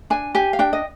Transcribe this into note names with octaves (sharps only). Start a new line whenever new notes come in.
D4 G#5
G4 G#5
F5
D4 G5
D#5